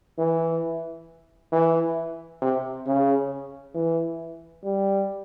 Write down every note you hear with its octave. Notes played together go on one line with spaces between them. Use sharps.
E3
E3
C3
C#3
E3
G3